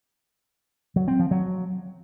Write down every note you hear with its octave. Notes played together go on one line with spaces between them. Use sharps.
F#3
C4
F3
F#3